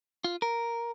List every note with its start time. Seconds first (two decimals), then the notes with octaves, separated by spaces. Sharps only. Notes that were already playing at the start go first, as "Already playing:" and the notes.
0.24 F4
0.42 A#4